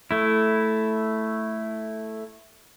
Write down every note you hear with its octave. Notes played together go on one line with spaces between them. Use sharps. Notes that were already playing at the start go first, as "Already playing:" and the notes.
A3 E4